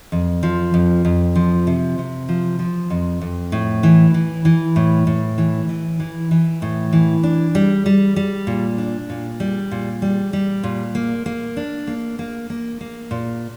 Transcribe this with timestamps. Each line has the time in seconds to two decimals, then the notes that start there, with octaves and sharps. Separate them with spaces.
0.12 F2
0.43 F3
0.74 F2
1.05 F2
1.36 F3
1.67 C3
1.98 C3
2.29 F3
2.59 F3
2.90 F2
3.21 F2
3.52 A2
3.83 E3
4.14 E3
4.45 E3
4.76 A2
5.07 A2
5.38 E3
5.69 E3
6.00 E3
6.31 E3
6.62 A2
6.93 E3
7.23 D4
7.55 G3
7.86 G3
8.16 G3
8.47 A#2
8.78 D4
9.10 A#2
9.40 G3
9.71 A#2
10.02 G3
10.33 G3
10.64 A#2
10.95 A#3
11.26 A#3
11.57 D4
11.87 A#3
12.19 A#3
12.50 A#3
12.81 A#3
13.11 A#2